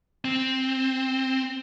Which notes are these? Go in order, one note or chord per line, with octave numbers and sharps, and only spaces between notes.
C4